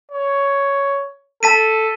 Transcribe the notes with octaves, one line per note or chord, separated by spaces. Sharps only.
C#5
A4 A5 B6 D#7